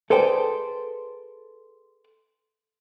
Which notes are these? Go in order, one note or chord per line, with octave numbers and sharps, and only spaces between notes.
G#4 A4 B4 C5 D5 G5